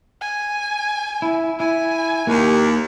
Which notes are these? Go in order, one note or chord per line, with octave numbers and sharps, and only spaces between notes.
G#5
E4
E4 G#5
D#2 A#3 G4 A#4